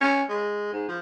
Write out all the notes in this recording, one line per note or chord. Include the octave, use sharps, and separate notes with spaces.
C#4
G#3
G#2
F3